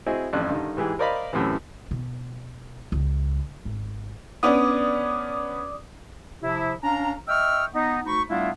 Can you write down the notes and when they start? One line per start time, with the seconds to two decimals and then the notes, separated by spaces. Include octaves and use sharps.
0.06 C4 E4 F#4 G#4 D#5
0.33 A1 F2 D4 F#6
0.49 G2 D3 D#3
0.77 G#2 E3 G4 G#4
0.99 A#4 C5 D5 D#5 F5 B5
1.33 F#2 A2 C3 E3
1.91 B2
2.92 C#2
3.65 G#1
4.43 B3 C#4 D4 D5 D6 D#6
6.42 C3 F3 E4
6.83 C#4 D4 F5 A#5
7.28 D#5 E5 G5 C#6 E6 F6
7.74 B3 D#4
8.05 D2 D#4 B5 C#6
8.30 G3 A3 B3 D4 E4 F4